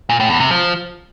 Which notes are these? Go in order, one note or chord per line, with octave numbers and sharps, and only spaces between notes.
A#2
A2
E2
C3
F3